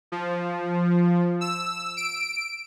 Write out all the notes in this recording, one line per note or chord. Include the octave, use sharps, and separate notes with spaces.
F3
E6
D7